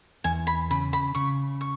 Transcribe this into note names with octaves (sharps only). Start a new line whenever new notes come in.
E2 G#5
B5
C#3 B5
B5
C#3 C#6
C#6